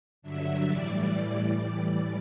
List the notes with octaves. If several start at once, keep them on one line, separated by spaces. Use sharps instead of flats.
G2 D3 F#3 E5
A2 E3 G3 D5